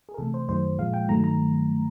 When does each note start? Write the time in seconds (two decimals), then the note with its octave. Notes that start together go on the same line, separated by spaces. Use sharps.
0.09 G#4
0.14 A#4
0.18 C3 E3 A3 A4
0.34 C5
0.49 F#2 D#3 F#3 A3 C5
0.79 A#2 F3 G#3 F5
0.94 G5
1.09 G2 D#3 F#3 A3 A#5
1.24 A#5